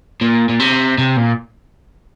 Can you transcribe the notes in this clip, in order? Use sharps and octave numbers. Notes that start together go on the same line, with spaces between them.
A#2
A#2
C3
C3
A#2